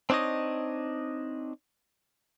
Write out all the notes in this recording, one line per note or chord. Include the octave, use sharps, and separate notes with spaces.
C4 D4 D#4 C#5 D#5